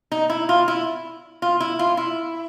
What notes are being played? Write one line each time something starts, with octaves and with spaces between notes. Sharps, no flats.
D#4
E4
F4
E4
F4
E4
F4
E4